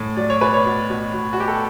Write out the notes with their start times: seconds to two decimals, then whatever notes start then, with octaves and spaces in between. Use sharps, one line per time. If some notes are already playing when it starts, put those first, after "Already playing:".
Already playing: A2
0.16 F#3 D5
0.30 C#5
0.41 B2 B4
0.54 C#5
0.66 B2
0.90 B2
1.14 B2
1.33 F#4
1.38 B2 G4
1.48 A4